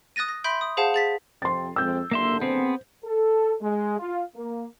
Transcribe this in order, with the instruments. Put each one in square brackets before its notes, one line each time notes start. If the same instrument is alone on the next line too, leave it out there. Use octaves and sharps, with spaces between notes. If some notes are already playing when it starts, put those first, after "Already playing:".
[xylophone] D#6 F#6 A6 A#6 D#7
A#6
E5 B5 C6 G6 D7
D#6
G#4 C5 F5 F#5 A5
G#4 A6 B6
[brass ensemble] F2 C3 C4 [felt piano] C6 A6
[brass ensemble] F2 G#3 C4 [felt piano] E6 G6
[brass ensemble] F#1 D3 [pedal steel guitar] A#3 E5 C6
[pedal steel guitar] B3 C4 G#4 [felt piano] C5
[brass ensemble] A4
G#3
F4
A#3